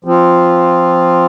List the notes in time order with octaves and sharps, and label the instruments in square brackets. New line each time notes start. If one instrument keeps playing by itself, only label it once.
[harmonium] F3 C4 F4